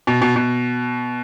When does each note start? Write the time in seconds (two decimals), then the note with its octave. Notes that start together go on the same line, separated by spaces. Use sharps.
0.07 B2
0.22 B2
0.36 B2